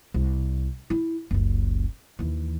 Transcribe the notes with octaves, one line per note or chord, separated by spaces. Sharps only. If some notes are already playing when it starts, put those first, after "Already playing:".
C2
E4
F#1 C#2
D#2 E3